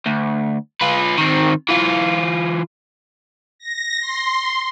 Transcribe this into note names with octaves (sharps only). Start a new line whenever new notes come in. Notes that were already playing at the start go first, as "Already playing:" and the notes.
D2
F4 B4
D#3 C4
E3 F4
A#6
C6